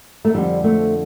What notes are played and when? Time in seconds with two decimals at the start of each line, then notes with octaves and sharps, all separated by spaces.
0.25 A3
0.34 F2 D3 F3 G3
0.64 A3